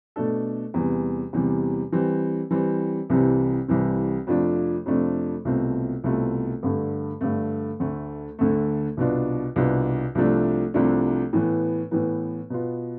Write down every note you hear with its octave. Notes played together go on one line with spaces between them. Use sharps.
B2 A3 D4 A4
E2 C3 E3 G3
E2 C3 E3 G3
E3 G3 C4
E3 G3 C4
C2 C3 E3 G3 C4
C2 C3 E3 G3 C4
F2 C3 F3 A3 D4
F2 C3 F3 A3 D4
C2 B2 A3 C4 F4
C2 B2 A3 C4 F4
G2 D3 A3
G2 D3 A3
D2 D3 A3
D2 D3 A3
C2 B2 B3 D4 F4
C2 B2 B3 D4 F4
C2 C3 F3 A3 D4
C2 C3 F3 A3 D4
A2 E3 B3
A2 E3 B3
B2 B3 F4